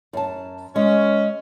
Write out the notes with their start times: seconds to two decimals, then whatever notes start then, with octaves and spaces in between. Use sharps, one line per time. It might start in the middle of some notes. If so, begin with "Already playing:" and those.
0.13 F#2 A5
0.76 G#3 C#4